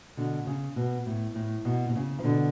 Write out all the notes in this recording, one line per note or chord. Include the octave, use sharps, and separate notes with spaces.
B2 D3
C#3
B2
A2
A2
B2
B2
C#3
F3
B2 D3